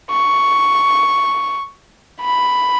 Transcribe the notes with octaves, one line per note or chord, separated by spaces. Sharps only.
C#6
B5